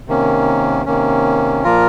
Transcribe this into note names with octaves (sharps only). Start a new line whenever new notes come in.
C3 D#3 A#3 C#4
C3 D#3 A#3 C#4
A#2 F3 A#3 F4 A#4